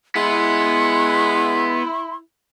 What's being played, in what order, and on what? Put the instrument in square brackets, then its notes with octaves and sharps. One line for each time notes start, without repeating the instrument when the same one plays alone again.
[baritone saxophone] G#3 [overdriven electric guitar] B3 [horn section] E4 [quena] C6